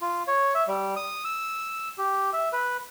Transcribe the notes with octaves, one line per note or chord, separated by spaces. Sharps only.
F4
C#5
E5
G3
D#6
E6
G4
E5
B4